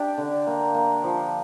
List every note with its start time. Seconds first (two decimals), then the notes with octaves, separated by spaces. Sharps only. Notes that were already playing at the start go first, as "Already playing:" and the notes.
Already playing: D4 G4
0.18 D3
0.47 A#3
0.75 A#3
1.04 F3